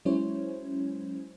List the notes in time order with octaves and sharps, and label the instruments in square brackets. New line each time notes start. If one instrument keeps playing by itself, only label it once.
[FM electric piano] F#3 G#3 C#4 E4 C5 C#5